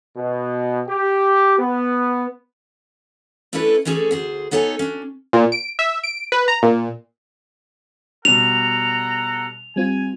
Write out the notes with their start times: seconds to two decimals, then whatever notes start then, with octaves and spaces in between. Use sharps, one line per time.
0.17 B2
0.87 G4
1.58 B3
3.53 A3 C#4 D4 E4 A4 B4
3.85 E3 A3 C#4 G#4 A4
4.11 D2 G#4 C5
4.51 B3 D#4 A4 C#5 D5 G#5
4.79 C#4 D4
5.33 A#2
5.52 D7
5.79 E5
6.04 D7
6.32 B4
6.48 A#5
6.63 A#2
8.25 B2 G3 A4 F#5 A#5 F7
9.76 G3 C4 F4 G#5